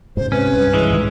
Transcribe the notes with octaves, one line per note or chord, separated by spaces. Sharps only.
G#2 C#3 C5
C3 C#4 B4
C2 G2
E3 G#3
G#2 D#3